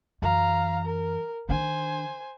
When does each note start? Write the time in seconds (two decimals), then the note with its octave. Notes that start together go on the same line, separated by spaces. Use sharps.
0.22 F#2 E3 F5 A#5
0.85 A#4
1.49 D#3 D4 C5 G#5